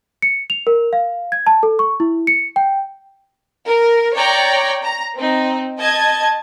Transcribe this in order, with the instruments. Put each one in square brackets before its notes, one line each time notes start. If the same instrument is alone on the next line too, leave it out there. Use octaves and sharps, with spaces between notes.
[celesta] C#7
F7
A#4
F5
G#6
A5
A4
C#6
E4
C#7
G5
[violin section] A#4
C#5 D5 G5 A#5
A#5
C4 D#4
D#5 A5 G#6